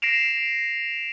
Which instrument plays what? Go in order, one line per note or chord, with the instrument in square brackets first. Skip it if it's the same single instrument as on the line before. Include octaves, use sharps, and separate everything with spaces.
[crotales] A#6 C7 D7 E7 F7